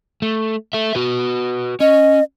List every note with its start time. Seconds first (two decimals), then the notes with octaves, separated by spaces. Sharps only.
0.22 A3
0.73 A4 E5
0.95 F#4 B4
1.80 C#4 D#5